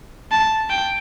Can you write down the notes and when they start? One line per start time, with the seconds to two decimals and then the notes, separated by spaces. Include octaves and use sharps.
0.32 A5
0.70 G5